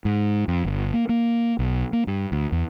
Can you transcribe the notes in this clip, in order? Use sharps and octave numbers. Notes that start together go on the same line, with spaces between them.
G#2
F2
G1
A#3
A#3
B1
A#3
G2
D2
E2